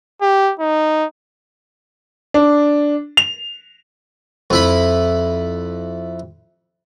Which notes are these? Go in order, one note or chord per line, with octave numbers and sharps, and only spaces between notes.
G4
D#4
D4
F7
F2 E4 B5